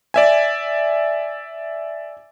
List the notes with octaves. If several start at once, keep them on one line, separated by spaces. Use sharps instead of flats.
D5 E5 G#5